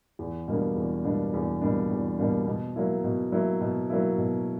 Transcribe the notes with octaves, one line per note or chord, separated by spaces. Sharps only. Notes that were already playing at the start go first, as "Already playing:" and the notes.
E2
B2 G3 A#3 D4
E2
B2 G3 A#3 D4
E2
B2 G3 A#3 D4
E2
B2 G3 A#3 D4
B2
F#3 A#3 E4
B2
F#3 A#3 E4
B2
F#3 A#3 E4
B2